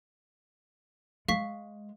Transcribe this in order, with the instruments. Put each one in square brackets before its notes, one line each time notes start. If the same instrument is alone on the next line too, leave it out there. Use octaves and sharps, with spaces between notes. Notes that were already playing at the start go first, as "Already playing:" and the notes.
[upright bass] G#3 [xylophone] F5 C#6 B6